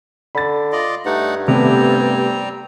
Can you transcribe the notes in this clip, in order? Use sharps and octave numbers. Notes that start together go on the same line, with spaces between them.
D3 B5 A6
F4 D5 D#5
G2 A3 D#4 F#5
C3 G3 A3 B3 C4 A#5